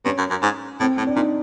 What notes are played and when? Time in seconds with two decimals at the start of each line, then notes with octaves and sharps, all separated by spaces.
0.05 G2 C#4
0.18 F#2
0.30 F#2
0.43 G#2
0.80 A2 C4
0.98 A2 C4
1.07 D4
1.16 A#2 D#4